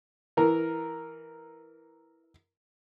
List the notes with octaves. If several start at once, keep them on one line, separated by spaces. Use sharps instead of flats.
E3 A#4